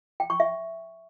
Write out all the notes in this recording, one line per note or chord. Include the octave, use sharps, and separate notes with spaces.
G5
C#6
E5